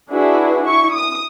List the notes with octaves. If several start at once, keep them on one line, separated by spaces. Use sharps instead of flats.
D4 E4 F#4 G#4 B4
E4 C#6
D#6